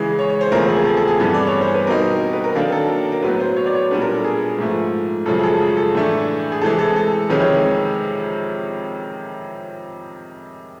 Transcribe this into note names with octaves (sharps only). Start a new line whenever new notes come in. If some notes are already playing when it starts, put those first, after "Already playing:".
Already playing: C#3 E3 G#3
C#5
C#5
C5
E2 C#3 F3 A3 C4 A#4
G#4
A4
A4
G#4
G2 E3 G3 B3 A4
D5
C#5
C5
B4
B2 G3 C4 D#4 A#4
B4
A#4
D#3 F#3 A#3 D4 A4
A4
A#4
A#4
A2 F#3 B3 B4
C5
C#5
D5
C#5
A#2 G3 B3 D4 B4
A#4
A4
G#4
G#2 F3 A3
F#2 C#3 F3 G#3 A4
G#4
A4
G#4
A4
A2 E3 A3 D4
G#4
C3 E3 G#3 A4
A4
A4
F2 C3 D#3 G#3 C#4 B4
C#5